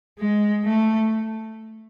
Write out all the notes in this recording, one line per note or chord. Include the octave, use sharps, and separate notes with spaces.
G#3
A3